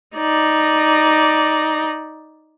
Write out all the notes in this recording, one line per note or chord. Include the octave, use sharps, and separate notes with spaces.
D#4 D5